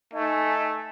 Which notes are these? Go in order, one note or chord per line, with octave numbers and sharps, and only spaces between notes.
A3 D#4 G#5